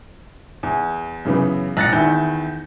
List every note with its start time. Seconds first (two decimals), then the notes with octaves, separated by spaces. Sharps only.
0.63 E2
1.25 F#2 C#3 E3 B3
1.77 A#1 F#6 A6 A#6 C#7
1.93 E2 D#3 E4 G6